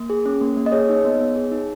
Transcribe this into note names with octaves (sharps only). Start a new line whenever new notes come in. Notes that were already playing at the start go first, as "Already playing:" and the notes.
Already playing: A#3
G#4
C#4
A#3
A#3
D#5
G#4 C#5
D#4
B3
B3
G#4
D#4